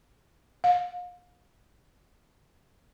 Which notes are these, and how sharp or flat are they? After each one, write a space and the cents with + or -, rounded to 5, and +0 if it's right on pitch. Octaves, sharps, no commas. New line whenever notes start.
F5 +35